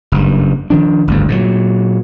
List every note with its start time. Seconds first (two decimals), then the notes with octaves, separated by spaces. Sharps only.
0.12 F#1 G2
0.70 D#3 F3 D4
1.08 G1 D2 G#2
1.28 A#2 D3 F#3